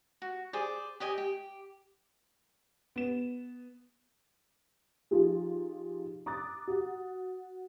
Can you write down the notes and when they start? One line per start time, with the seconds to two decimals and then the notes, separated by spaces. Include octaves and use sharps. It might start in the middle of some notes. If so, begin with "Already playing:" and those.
0.22 F#4
0.53 G#4 C5 D5
1.00 G4 D5 D#5 G#5
1.18 G4
2.96 B3 E7
5.11 F3 D#4 F4 G4 G#4
6.26 A#5 D6 D#6 F#6 A6
6.67 F#4 F#5